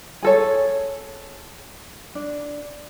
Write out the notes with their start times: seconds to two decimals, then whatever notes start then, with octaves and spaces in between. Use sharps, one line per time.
0.23 G#4 A4 C#5
2.15 D4